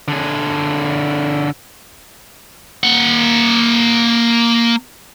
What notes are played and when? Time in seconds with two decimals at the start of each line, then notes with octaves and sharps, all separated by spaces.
0.08 D3 G#4
2.84 A#3 F#5